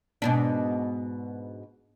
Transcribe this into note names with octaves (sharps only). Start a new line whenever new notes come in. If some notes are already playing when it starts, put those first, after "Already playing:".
G#2 B2 D4